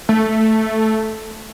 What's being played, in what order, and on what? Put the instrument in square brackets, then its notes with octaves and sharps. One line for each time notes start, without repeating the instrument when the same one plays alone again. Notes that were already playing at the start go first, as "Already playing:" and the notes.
[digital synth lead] A3